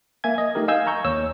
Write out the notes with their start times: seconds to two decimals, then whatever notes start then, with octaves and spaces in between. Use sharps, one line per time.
0.24 A#3 E5 G#5 G#6
0.38 D#5
0.55 A3 D#4 G4 A#4
0.68 D#5 F5 G#5 E6 G6 G#6
0.87 A#5 C#6 G6
1.05 D#2 C#5 E6